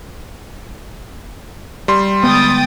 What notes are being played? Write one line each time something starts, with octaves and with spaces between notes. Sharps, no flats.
G3 C6
D3 G#3 B3 G5 D#6 A6